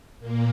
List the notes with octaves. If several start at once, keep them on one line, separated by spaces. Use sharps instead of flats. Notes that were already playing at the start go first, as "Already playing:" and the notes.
A#2 A#3